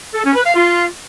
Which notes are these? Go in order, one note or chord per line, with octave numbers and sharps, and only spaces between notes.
A4
C#4
B4
F5
F4